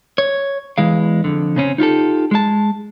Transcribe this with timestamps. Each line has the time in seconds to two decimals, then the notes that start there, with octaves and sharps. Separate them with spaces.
0.18 C#5
0.78 E2 E3 G#3 F5
1.24 F2 D3
1.56 C#3 C4 C#4
1.78 D#4 F4 G4 A4
2.31 G#3 A5